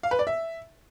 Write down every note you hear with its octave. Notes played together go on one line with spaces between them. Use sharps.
F5
B4
D5
E5